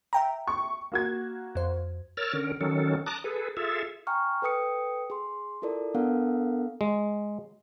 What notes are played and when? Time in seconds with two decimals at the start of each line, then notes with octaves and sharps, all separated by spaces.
0.13 E5 G5 A#5
0.47 C#6
0.92 A#3 F#4 G#6
1.55 F2 C5
2.17 A#4 C#5 E6 F6 A6
2.33 D3 C#4 A#4
2.61 D#3 F#3 C#4 A4
3.06 A5 A#5 D6 D#6 F#6
3.24 G#4 A4 B4
3.57 F4 G#4 A4 E5
4.07 G5 G#5 A#5 C#6 F6
4.42 A4 B4 G5 D#6 C#7
5.10 G#4 C6
5.62 E4 F4 A4 A#4 D5
5.95 B3 D4 A4 A#4 F5 F#5
6.81 G#3